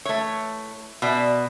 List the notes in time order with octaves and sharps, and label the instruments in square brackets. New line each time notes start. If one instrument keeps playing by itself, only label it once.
[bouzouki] E3 [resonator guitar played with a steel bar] A3 C#5
[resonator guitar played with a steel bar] B2 [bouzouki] D5 E5